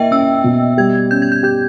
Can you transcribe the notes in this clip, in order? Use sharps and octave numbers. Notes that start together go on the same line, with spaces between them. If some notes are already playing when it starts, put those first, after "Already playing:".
Already playing: A#3 E4 D#5 E5 G5
C#4 E6
B2
G3 G#6
C#4 G6
G#6
G6
G4 G6